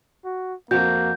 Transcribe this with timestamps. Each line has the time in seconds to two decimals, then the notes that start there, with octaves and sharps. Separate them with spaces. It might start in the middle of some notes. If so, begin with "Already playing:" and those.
0.25 F#4
0.71 F2 A#3 F#4 G6